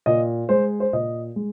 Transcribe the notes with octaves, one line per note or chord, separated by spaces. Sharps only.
A#2 D#5
G#3 C5
C5
A#2 D#5
G#3